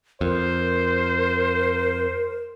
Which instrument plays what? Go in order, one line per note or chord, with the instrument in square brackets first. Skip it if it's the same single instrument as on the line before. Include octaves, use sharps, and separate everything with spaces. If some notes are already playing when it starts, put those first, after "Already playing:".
[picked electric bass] F2 [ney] A#4 [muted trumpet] C5